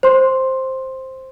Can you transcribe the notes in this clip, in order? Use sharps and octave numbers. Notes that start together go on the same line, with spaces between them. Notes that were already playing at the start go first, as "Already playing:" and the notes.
C5 C6